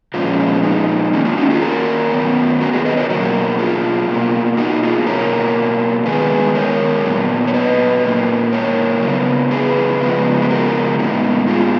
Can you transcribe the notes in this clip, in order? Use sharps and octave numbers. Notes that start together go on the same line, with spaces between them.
A#2 F3 G#3 B3 C#4 F4
D#4
D#3 A#3 C#4
C#4 F4
D#4 F#4
F4 G#4
F#4 A#4
D#3 F#3 B3
F#4 A#4
G#4 B4
B4 D#5
A#4 C#5
B2 F#3 A#3 F#4 A#4
F4 G#4
B2 A#3
D#4 F#4
F4 G#4
B2 F#3 A#3 A#4 C#5
D#3 G#3 B3 G#4 B4
A#4 C#5
A#2 F#3 B3
C#5
B4 D#5
A#2 F#3 A#3
A#4 C#5
C#3 F#3 B3
G#4 B4
C#3 F3 G#3 B3
B4
F#4 A#4
A#2 G#3 B3 D#4
F4 G#4